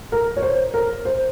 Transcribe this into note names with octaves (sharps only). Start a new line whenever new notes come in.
A#4
C#5
C5
A#4
C5